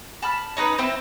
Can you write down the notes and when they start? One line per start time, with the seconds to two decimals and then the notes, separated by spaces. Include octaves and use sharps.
0.22 A5 B5 F6
0.57 C#4 D#4 B4
0.78 C4 E4 C5